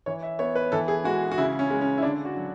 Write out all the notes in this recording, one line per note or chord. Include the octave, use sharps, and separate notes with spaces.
E3 C#5
E5
B3 C#5
B4
E3 A4
G#4
G#3 F#4
F#4
C#3 E4
C#4
G#3
C#4
E4
D3 D4
F#4
F#3